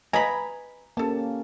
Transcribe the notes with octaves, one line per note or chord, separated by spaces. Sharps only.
B4 D#5 G#5 A#5 B5
A#3 C#4 G4 A4 A5